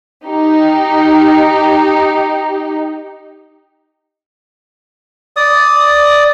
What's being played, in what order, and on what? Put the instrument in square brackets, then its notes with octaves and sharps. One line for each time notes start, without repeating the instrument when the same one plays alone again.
[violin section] D#4 G4
[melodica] D5 D#6